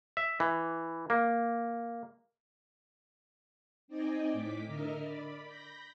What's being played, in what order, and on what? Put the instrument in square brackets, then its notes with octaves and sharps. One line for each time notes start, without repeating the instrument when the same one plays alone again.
[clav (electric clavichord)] E5
E3
A#3
[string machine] C4 D#4 D5 D#5 G5 G#5
A2 D6 B6
D3 A#4 D#5 E5 F6
D5 B5
B5 G6 A#6